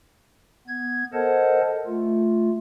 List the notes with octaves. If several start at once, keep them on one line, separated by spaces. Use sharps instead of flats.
B3 G#6
A4 A#4 C5 D#5 F#5 A5
A3 F4